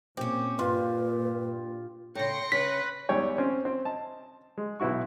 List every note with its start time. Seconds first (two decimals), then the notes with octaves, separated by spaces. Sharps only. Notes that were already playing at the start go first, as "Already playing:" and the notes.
0.17 A#2 C4 C#4 G4
0.59 G2 A#2 F4 B4
2.15 A2 C#3 G5 C6 A#6 C#7
2.52 C#3 B4 B6
3.09 E2 G#2 G3 C#5 G5
3.38 C4 C#4
3.65 C4
3.85 D#5 A5
4.58 G#3
4.80 B1 B3 E4 F#4 C#6